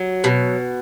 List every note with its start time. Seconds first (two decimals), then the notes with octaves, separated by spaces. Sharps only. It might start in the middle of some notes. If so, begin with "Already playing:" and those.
Already playing: F#3
0.24 B2